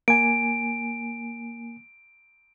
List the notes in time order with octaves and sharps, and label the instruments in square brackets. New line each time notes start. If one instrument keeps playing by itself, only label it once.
[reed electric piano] A#3 G#5 [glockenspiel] D7